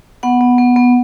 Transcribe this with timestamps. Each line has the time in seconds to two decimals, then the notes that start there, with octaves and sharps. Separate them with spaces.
0.23 B3 F#5
0.41 B3
0.58 B3
0.76 B3